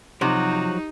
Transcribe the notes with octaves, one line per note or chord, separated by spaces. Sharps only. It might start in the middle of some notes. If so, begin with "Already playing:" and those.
C3 F3 F#3 D#4 F#4